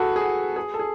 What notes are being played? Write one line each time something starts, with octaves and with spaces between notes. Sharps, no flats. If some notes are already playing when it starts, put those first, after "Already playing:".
Already playing: F#4 G#4 A4 B4
G#4
F#4
G#4
A4
G#4